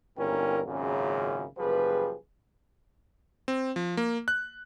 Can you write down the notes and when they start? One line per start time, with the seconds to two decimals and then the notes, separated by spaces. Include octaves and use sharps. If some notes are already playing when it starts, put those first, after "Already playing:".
0.17 G1 A#2 C#4 E4 A#4 G5
0.66 G#1 F#2 A#2 C#3
1.58 F#1 F3 G3 G#4 B4
3.48 C4
3.76 F3
3.97 A#3
4.28 F#6